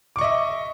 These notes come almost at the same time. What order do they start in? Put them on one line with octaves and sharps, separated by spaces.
D6 C#6 D#5 E5